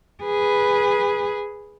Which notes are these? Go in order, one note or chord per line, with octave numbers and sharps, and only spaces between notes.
G#4 B4